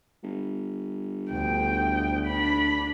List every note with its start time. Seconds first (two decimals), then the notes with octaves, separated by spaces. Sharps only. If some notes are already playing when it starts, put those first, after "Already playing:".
0.23 G1
1.32 D2 G5
2.27 D4 B5